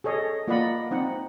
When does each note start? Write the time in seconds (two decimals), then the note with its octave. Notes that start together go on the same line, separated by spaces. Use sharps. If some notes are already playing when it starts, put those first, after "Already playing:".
0.04 G#4 A4 C#5 D#5
0.48 A#3 F4 D5 D#5 F#5 B5
0.91 C4 D#4 F#5